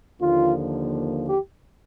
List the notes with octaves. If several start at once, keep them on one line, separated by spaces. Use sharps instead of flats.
D#2 D3 F3 A#3 F4
G4